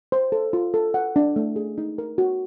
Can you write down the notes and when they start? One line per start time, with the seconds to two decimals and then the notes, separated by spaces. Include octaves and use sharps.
0.12 C5
0.32 A4
0.53 F4
0.74 A4
0.94 F#5
1.16 D4
1.36 A3
1.56 G#4
1.78 D#4
1.98 A#4
2.18 F#4